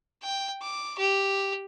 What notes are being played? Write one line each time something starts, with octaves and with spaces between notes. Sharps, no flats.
G5
D6
G4